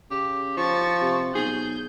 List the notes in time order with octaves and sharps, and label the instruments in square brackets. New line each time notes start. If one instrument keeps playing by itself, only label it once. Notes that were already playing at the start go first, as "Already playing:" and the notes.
[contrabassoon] C#3 [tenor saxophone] G4
[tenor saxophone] F3 [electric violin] C#6 A6
[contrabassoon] C3
[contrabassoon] B1 [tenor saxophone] G#4 [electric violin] G6